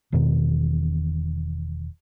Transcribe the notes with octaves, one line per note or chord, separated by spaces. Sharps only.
E1 E2 B2 D#3